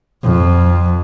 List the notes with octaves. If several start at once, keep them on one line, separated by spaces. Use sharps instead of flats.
F2